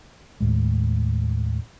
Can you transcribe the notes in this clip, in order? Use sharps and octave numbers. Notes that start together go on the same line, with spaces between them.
D#2 A2 G#3